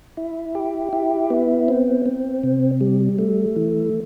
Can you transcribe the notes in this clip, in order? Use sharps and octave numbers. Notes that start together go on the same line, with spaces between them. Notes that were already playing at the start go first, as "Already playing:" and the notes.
E4
G4
E4
B3
C4
C4
C3
G3
A3
E3